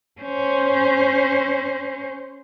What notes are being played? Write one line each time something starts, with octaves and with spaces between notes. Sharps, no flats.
C#4 C5